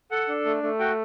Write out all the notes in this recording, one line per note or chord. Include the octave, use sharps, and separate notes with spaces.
A4 F#5
D4
A3
A3
F#4 G5